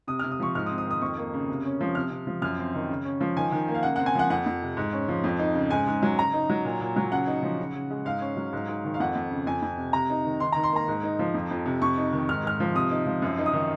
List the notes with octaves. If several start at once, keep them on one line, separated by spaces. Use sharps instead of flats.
C3 D#6
F6
C3
D#6
F3 C#6
G#2 F6
D#6
C4
D#6
D#3
D#6
F2 C#6
A#3
C#3
C3
C#4
F3
C3 F6
C3
F3
F#2 F6
C4
D#3
C#3
C#4
F3
D#3 G#5
D#3
A#3
F5
C#3 F#5
C4 F#5
G#5
F3 F#5
F2 F#5
F2
C3
G#2
C#4
F3
F2
D#4
C#3
G#2 G#5
G#2
F#3
C#3 A#5
D#4
F#3
A#2
A#2
F#3
C#3 F#5
D#4
F3
C#3
C#3
G#3
G#2 F5
C#4
F#3
G#2
G#2
D#3
F5
F2 F#5
F2
C#3
F2 G#5
F2
C3
C3 A#5
D#4
D#3
D#3 C6
A#5
D#3
C6
A#3 A#5
G#2
D#4
F3
F2
F2
C3
F2 C#6
D#4
D#3
G#2 F6
G#2 F6
F3
C3 D#6
D#4
F3
F#2
D#4
D#6
D#3